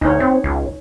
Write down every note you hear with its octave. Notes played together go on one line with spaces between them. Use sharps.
D2 D#4 C#5
C4
C#2